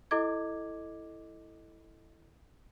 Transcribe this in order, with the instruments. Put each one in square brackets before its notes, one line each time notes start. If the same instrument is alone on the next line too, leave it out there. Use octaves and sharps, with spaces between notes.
[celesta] E4 A4 D#5 D6 G#6